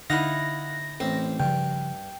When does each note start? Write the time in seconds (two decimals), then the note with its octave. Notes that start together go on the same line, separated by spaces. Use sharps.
0.10 D3 D#4 E4 F5 F#5 A#6
1.00 A1 C4 C5
1.40 G2 C#3 F3 G5